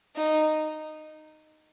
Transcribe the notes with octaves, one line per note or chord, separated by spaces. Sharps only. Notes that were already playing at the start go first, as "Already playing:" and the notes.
D#4